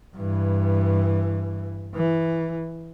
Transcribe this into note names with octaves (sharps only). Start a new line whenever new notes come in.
G2 E3
E3